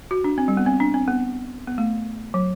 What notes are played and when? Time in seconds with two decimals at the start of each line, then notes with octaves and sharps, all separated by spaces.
0.11 F#4
0.24 D4
0.38 C4
0.48 G3
0.57 B3
0.66 C4
0.80 D4
0.94 C4
1.08 B3
1.67 B3
1.78 A3
2.34 F#3